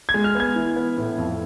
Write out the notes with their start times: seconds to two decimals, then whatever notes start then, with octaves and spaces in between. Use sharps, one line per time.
0.09 G#6
0.14 G#3
0.24 F6
0.35 B3
0.40 G#6
0.56 E3
0.76 B3
0.97 A2
1.18 F2